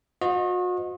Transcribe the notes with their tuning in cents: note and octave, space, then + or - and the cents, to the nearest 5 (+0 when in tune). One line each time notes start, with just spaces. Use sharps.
F#4 -40 C5 -25 D#5 +0